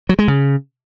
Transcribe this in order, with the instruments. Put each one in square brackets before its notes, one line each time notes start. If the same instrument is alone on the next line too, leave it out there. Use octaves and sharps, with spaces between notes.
[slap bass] F#3
G#3
C#3